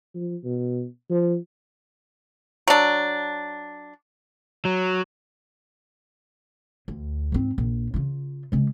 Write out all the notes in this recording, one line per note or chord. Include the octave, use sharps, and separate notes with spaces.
F3
B2
F3
F#3 D4
F#3
D2
G#2 C4
A#1
C#3 F4
C#3 G#3